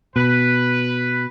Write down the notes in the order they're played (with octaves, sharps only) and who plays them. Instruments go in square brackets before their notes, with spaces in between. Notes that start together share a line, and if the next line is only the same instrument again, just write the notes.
[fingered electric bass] B2 [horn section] B4